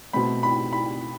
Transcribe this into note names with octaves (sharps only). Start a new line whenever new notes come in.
B2 A3 C4 B5
B5
B5